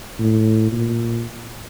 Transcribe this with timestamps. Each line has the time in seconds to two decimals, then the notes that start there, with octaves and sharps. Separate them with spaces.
0.19 A2
0.72 A#2